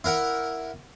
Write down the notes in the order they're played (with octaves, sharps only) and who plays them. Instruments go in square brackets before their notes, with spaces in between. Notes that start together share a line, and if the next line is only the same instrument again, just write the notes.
[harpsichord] E4 A#4 F#5